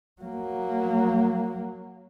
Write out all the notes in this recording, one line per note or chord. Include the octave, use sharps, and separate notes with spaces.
F#3 A#3